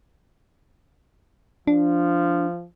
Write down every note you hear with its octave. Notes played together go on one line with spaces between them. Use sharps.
F3 D4